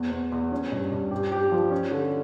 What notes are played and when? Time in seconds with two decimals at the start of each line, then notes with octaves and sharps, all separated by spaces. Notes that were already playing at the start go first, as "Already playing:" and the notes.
Already playing: E2
0.11 E2
0.32 E2
0.52 C#4
0.72 G2
0.91 G2
1.11 G4
1.32 G4
1.52 F3
1.71 C#4
1.91 D3